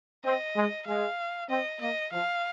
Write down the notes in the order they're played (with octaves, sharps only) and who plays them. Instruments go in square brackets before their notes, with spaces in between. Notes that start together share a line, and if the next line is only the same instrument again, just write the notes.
[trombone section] C4 [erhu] D#5
[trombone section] G#3
[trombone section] G#3 [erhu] F5
[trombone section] C4 [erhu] D#5
[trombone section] A#3 [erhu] D#5
[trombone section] F3 [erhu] F5